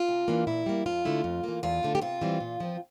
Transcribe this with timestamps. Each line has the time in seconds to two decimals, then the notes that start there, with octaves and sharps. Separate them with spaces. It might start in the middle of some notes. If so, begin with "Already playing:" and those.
Already playing: F4
0.08 C3
0.28 E3 A#3 D4
0.47 A#2 E4
0.66 G3 A#3
0.86 F2 F4
1.05 D3 A3 E4
1.24 F2
1.44 E3 A#3
1.63 E2 F4
1.83 D3 A3
1.95 G4
2.02 C3 F4
2.21 E3 G3 C4
2.40 A#2
2.60 F3 C4